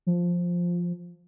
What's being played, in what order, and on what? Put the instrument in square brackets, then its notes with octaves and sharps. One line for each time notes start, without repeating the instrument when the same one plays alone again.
[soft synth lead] F3